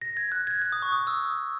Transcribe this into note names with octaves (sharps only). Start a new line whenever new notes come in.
A#6
G#6
F#6
G#6
F#6
D#6
C#6
D#6
E6